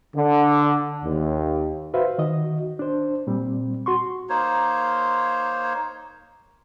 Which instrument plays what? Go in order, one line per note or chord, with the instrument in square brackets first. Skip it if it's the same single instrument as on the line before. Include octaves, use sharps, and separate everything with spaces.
[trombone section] D3
D#2
[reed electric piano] F#4 B4 C5 E5 F5
D#3 F#4 D#5
D4 C5
A#2 G3 C4
F#4 C6 C#6
[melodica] A#3 D#4 C5 C#5